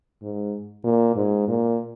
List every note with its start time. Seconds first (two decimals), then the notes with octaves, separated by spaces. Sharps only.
0.22 G#2
0.84 A#2
1.16 G#2
1.48 A#2